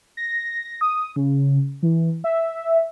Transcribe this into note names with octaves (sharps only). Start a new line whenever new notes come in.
A#6
D#6
C#3
E3
E5